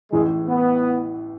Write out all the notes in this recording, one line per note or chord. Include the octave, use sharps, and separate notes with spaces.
A1 A2 E3 G#3
B3